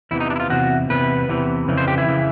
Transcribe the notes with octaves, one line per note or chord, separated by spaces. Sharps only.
E2 C3 E3 E4
D#4
D4
E4
F4
E2 C3 F#4
E2 C3 B4
E2 C3 E3
F2 C#3 E3
C5
G4
E4
C#3 E3